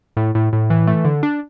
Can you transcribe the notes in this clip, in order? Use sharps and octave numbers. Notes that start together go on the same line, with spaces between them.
A2
A2
A2
E3
A3
D3
D4